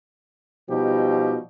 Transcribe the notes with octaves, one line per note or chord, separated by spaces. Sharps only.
B2 F3 G3 D#4 G4